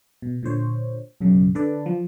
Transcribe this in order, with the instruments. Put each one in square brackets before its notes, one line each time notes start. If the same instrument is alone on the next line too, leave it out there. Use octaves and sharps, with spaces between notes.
[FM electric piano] B2
A#2 D3 C5 C#5
B1 F#2 C#3
D3 A4 B4 D5
F3